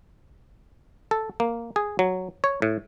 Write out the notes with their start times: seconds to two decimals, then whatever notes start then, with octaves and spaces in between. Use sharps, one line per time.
1.11 A4
1.40 A#3
1.76 G#4
1.99 F#3
2.44 C#5
2.62 A2